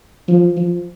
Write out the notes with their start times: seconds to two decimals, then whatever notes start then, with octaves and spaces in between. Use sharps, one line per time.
0.28 F3
0.56 F3